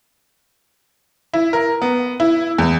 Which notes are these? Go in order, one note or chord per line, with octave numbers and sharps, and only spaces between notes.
E4
A#4
B3
E4
E2